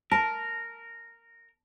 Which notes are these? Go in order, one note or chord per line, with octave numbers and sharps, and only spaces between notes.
A#4 A5